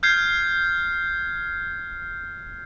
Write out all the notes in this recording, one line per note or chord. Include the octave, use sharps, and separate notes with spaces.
F6 G6 G#6 C7